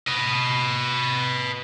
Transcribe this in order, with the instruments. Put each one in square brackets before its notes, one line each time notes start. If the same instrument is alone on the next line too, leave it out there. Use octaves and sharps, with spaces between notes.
[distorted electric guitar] B4 D#5